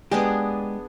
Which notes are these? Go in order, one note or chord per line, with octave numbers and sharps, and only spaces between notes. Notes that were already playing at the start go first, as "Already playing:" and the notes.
G#3 B3 D4 G4 G#4